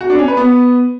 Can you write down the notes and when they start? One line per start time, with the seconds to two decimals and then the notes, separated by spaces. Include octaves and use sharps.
0.01 F#4
0.10 D4
0.19 C#4
0.28 B4
0.37 B3